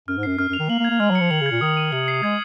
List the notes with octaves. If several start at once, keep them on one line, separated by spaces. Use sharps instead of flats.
F#2 F6
G#2
F#2 C7
F#2 F6
F#2
F7
D#3
A#3 F#7
A#3
G#6
A#3
G#3 F6
F#3
F3 C#7
D#3 F#7
C#3
G#6
A#2
D#3 D#6
D#7
C3 F#7
C7
G#3 G#6